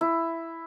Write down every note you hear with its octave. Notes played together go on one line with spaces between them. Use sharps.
E4